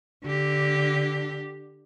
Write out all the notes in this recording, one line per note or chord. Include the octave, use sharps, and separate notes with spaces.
D3 G4